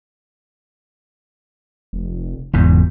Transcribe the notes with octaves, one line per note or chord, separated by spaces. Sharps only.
F1
F#1 E2 G#2 E3